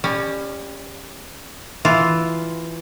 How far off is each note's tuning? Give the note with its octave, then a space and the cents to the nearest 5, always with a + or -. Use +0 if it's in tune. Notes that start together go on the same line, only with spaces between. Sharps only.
G3 +25 C#4 +0
E3 +0 F4 +0